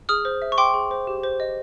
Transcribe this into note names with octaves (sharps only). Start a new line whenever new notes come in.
G#4 D#6 F6
C5
E5
C#6
G5 C6 D6
G#4
C5
G4
C5
D#5